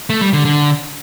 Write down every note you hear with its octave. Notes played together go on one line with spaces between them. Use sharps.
A3
G3
D3
D3